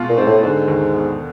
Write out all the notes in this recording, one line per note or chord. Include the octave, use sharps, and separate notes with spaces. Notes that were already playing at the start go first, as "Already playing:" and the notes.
Already playing: B2 G#3 F4
A#2
G#2 C4
A2
G#2 D3
D#2
B3